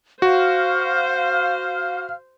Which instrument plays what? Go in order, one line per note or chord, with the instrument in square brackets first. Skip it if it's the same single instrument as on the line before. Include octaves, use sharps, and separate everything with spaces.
[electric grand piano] F#4 [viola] C5 [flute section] F5 F6